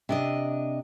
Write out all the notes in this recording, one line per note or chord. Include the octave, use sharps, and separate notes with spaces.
C3 D4 D#5